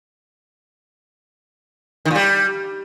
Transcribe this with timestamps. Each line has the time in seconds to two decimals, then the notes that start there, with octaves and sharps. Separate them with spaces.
2.05 D#3
2.11 A#2
2.16 G3